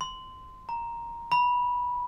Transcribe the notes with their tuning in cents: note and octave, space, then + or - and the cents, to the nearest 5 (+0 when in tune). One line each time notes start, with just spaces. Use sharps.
C6 -20
A#5 +5
B5 -15